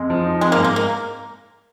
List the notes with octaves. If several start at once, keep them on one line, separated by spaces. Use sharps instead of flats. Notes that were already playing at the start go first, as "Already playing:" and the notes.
Already playing: F2 G#3
F3
D#4
G#3 C4
A#3
G#2
A#3
A#3